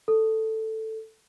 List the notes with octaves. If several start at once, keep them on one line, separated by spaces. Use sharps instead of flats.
A4